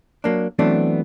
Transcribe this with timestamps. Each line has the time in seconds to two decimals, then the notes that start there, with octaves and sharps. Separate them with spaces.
0.24 F#3 A#3 D4
0.59 E3 F#3 A3 B3 C4 D4